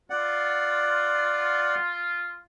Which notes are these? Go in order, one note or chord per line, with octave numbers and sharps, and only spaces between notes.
F4 D5 F#5